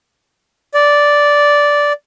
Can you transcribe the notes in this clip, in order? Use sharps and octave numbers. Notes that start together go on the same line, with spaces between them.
D5